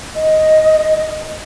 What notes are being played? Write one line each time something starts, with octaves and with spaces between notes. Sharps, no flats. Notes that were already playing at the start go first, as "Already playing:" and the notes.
D#5